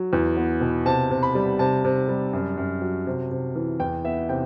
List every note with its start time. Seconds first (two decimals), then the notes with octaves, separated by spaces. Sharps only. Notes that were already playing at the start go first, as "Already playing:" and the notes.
Already playing: F#3
0.13 E2
0.37 B3
0.61 B2
0.85 C3 A5
1.10 C3
1.23 B5
1.35 G3
1.59 C3 A5
1.84 C3
2.09 G3
2.33 F#2
2.57 F#2
2.82 F#3
3.07 C3
3.31 C3
3.56 E3
3.80 E2 G5
4.04 B3 E5
4.29 C3 G5